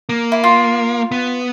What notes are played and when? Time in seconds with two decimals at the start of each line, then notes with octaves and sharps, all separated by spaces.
0.09 A#3
0.32 E4
0.44 F4
1.12 B3